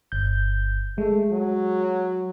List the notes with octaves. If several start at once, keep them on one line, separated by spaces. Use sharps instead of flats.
G1 G6
G#3 A3
F#3